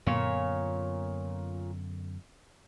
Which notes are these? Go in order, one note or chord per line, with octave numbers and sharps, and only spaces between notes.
F#2 A#2 D3 B3 C#5